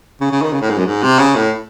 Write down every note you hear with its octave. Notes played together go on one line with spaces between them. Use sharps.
C#3
C#3
D#3
C#3
A2
G#2
F#2
G#2
C3
C#3
A2